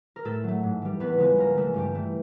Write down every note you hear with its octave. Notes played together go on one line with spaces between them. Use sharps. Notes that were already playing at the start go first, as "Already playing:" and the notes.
A#4
A2 A3 A4
F#3 A3
G#2
E3 G3
E2 B3 B4
C#3 F3 G#3 B3 B4
C#2 A#3 A#4
C#3 E3 G#3 A3 A4
G2 G3 G4
E3 A3